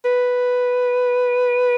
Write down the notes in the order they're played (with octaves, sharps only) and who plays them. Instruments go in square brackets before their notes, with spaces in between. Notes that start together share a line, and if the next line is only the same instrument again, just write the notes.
[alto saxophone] B4